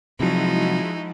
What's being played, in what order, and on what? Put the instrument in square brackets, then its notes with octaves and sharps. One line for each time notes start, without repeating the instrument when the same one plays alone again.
[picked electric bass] C3 F#3 [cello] F3 [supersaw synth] G#3 E4 F#4 [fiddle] D#4